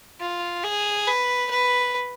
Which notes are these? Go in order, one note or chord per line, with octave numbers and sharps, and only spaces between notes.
F4
G#4
B4
B4